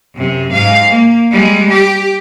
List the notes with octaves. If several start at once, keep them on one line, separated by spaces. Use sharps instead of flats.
F#2 C3
G#2 F5
A#3
G3 G#3
G4